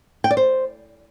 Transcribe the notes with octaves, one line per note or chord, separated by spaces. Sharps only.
G5
D5
C5